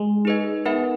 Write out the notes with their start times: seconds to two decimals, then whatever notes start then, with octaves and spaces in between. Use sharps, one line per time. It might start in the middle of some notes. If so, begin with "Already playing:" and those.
Already playing: G#3
0.25 D#4 G#4 B4 D#5
0.65 B3 D#4 A#4 E5